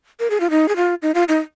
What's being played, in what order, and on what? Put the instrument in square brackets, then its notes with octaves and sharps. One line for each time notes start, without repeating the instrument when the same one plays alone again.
[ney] A#4
G#4
F4
D#4
G#4
F4
D#4
F4
D#4